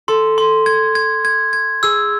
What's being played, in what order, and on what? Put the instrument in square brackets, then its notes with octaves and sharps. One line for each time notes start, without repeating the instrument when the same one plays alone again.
[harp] A4 [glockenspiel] C6
[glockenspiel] C6
G#6
G#6
G#6
G#6
[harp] G#4 [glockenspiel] E6